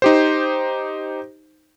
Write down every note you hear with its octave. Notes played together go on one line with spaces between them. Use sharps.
D#4 G4 C5